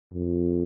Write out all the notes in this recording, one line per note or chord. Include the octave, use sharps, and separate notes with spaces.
F2